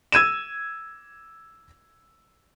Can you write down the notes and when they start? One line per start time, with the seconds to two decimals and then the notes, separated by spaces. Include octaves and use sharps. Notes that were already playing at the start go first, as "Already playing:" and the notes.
0.12 E6 G#6 D#7 E7